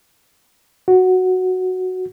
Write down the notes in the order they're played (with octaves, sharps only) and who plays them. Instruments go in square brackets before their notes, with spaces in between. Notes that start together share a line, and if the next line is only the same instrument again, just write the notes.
[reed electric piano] F#4